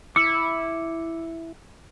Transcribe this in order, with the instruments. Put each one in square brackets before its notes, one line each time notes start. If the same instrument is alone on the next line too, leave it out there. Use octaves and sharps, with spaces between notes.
[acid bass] E4 [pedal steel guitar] D6 E6 [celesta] C#7